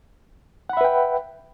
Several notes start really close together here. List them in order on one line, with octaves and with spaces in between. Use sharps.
F#5 B5 E5 B4 G5